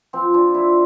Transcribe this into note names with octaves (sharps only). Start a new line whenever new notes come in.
F3 C4
F3 D4
F3 E4